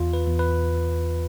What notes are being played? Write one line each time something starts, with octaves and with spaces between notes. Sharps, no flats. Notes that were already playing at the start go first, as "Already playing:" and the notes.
Already playing: E2 F4
B4
E2
B4